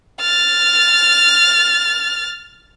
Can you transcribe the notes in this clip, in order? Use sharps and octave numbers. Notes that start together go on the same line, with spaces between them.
F6 A6